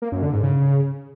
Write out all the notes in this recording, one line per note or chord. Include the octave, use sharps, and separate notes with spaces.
A#3
F#2
D3
G#2
C#3